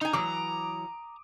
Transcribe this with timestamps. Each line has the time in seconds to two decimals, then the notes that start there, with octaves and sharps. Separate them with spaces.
0.01 D#4 G#5 A#5
0.13 E3 F#3 D6 D#6